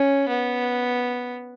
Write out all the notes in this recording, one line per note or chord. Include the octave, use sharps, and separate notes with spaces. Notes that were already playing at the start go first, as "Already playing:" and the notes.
Already playing: C#4
B3